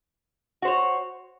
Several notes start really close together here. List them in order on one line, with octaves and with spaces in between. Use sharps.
F#4 C5 C#5